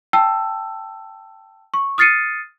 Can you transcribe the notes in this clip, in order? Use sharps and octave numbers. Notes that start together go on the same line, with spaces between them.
G5 A5 E6
C#6
D#6 F6 A6 C7 C#7 D#7